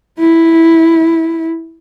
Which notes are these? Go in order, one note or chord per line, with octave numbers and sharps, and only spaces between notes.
E4